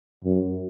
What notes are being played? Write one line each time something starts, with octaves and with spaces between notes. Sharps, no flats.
F#2